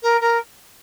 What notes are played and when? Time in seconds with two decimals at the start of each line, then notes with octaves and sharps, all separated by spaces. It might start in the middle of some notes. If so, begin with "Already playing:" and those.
0.02 A#4
0.20 A#4